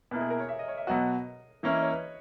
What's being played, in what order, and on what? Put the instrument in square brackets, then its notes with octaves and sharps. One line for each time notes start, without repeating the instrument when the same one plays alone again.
[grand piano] B2 A#3 E4 [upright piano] B4
[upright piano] G#4
A#4
C#5
E5
D#5
C#5
E5
[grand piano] B2 F#3 B3 F#4 [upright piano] D#5
[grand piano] E3 A#3 C#4 E4 [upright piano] E5
[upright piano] D#5
C#5
B4